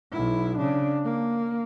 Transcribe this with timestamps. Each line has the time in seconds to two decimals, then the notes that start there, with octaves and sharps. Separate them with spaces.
0.12 B1 E4
0.58 C#3 D4
1.05 A#3